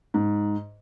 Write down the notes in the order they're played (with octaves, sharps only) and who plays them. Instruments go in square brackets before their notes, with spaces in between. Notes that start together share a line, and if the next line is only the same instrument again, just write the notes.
[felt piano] G#2